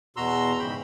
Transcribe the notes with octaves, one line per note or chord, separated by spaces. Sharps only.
E2 B2 F#4 A#5 C6 E6
G#2 C#3 E3 G5 B5